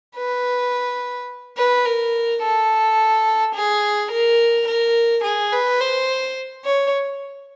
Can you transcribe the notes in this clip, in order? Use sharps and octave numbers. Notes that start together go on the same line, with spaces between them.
B4
B4
A#4
A4
G#4
A#4
A#4
G#4
B4
C5
C#5